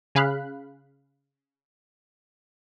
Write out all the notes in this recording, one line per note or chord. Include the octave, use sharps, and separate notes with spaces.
C#3 G#4 F5 B5 F#6